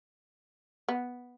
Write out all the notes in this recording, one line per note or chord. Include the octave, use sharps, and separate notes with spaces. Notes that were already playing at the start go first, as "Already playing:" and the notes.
B3